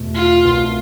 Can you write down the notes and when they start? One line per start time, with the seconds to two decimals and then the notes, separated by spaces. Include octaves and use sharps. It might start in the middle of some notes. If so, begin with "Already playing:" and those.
Already playing: E2 B2 A3
0.15 F4
0.45 C2 B2 A3